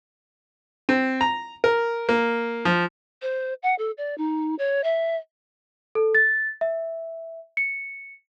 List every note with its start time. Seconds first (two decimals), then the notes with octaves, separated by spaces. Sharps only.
0.89 C4
1.21 A#5
1.64 A#4
2.09 A#3
2.65 F3
3.22 C5
3.63 F#5
3.78 A4
3.98 D5
4.18 D#4
4.59 C#5
4.84 E5
5.95 A4
6.15 A6
6.61 E5
7.57 C#7